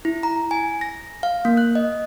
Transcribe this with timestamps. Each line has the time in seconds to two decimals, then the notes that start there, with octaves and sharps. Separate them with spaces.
0.05 E4
0.23 A#5
0.51 G#5
0.81 A#6
1.23 F5
1.45 A#3
1.57 F#6
1.75 D#5